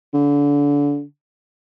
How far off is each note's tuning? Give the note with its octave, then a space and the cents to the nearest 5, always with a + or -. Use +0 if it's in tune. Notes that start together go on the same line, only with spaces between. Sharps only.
D3 -30